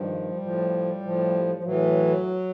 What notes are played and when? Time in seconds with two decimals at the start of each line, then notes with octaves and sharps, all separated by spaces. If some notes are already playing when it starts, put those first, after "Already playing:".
Already playing: G2 D#3 F3 G3
0.41 A2 F3
1.02 A2 F3
1.55 F3
1.63 A2 E3 F#3